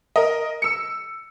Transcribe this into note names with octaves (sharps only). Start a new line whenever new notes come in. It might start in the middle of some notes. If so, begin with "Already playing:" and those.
A#4 D#5
E6 C#7